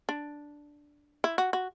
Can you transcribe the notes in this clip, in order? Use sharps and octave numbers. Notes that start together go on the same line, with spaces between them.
D4
E4
F#4
F#4